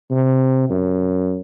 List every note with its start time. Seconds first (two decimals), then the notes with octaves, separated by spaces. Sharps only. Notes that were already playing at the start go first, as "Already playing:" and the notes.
0.11 C3
0.70 F#2